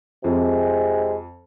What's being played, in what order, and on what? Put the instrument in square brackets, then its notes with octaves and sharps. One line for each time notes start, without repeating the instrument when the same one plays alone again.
[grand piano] F2 [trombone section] C3 G#3